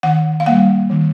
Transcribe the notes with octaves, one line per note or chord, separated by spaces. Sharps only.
D#3 F#5
F5
G3 A#3 F#5
D#3